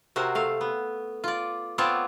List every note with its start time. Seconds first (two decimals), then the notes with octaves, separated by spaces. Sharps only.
0.16 C3 F#4 A#4 C5
0.35 A3 F5
0.61 B3
1.24 F4 D5
1.78 B3 C4 F4 C#5 D5 A5